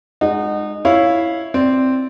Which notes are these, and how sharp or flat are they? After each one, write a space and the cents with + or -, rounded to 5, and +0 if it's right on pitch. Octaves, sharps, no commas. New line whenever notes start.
G#3 +0 D#4 -25 F#5 +0
E4 +0 C#5 +0 F5 +0
C4 +0 D5 +0